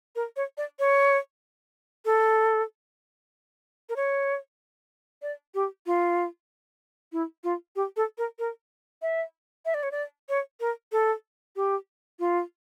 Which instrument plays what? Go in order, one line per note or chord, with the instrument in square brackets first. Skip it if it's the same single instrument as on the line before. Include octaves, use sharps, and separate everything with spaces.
[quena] A#4
C#5
D5
C#5
A4
A#4
C#5
D5
G4
F4
E4
F4
G4
A4
A#4
A#4
E5
E5
D5
C#5
D5
C#5
A#4
A4
G4
F4